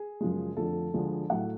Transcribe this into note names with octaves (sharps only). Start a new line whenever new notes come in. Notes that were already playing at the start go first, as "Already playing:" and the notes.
Already playing: G#4
F#2 C#3 F3 G#3
F2 D3 F3 A3 A4
D2 D3 F3 G#3
A2 F#3 A3 F#5